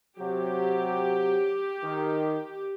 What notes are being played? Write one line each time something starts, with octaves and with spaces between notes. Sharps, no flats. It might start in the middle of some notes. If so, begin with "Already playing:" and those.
C3 F#3 G4
D#3